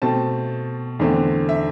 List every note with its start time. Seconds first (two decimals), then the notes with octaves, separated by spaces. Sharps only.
0.02 B2 A3 C4 A5
0.99 E2 D3 A3 C4
1.49 E5